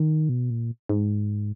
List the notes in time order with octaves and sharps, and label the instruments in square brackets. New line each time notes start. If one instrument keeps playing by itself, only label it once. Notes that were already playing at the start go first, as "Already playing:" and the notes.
Already playing: [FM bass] D#3
B2
A#2
G#2